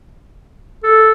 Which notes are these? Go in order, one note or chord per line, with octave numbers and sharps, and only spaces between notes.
A4